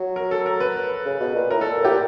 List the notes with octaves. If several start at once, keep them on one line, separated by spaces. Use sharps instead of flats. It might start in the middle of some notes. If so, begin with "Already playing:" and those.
Already playing: F#3
A#4
A4
A#4
B4
C#3
B2
A#2
A2 A#4
A#2 A4
A2 G4
A#2